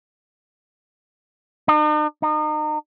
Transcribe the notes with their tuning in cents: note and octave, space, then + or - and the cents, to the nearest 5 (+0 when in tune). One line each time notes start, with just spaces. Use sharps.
D#4 -45
D#4 -35